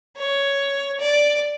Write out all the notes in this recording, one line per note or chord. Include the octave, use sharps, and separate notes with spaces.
C#5
D5